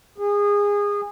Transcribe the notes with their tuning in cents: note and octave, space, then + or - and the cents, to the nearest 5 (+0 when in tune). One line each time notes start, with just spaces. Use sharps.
G#4 -25